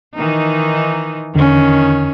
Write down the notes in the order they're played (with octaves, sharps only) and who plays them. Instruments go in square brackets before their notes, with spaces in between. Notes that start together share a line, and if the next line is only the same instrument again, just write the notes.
[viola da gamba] D#3 E3 D#4
[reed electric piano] E2 D3 [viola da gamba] D#3 C#4